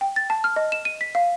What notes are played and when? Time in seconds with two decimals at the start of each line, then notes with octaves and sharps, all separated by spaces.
0.01 G5
0.16 A6
0.30 A5
0.44 F6
0.56 D#5
0.72 E7
0.85 D#7
1.01 B6
1.15 F5